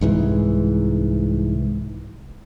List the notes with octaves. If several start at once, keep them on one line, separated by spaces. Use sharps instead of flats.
C2 G#2 E3